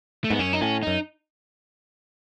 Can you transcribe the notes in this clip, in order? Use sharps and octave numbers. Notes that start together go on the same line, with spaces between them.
A3
G#2 B3
F#2 C#4
D#4
A2 C#4
F#2 D#4